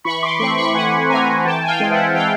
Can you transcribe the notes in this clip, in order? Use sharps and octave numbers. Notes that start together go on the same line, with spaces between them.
E3 B5 C#6
C6 D6
A3 C4 B5 C#6
B5 C#6
E3 F#5 G#5
A3 C4 G#5 A#5
E3 G5 A5
G#5
F5 G5
G#3 C4
E5 F#5
E3 F5 G5